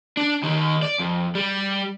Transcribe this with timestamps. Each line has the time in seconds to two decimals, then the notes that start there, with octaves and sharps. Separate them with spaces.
0.17 D4
0.43 D#2 D#3
0.82 D5
0.99 F2
1.35 G3